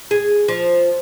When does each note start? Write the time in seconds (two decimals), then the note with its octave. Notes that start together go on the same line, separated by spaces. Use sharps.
0.11 G#4
0.48 F3